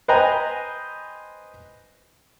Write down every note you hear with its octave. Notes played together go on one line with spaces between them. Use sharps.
B4 C5 D#5 G5 G#5 A#5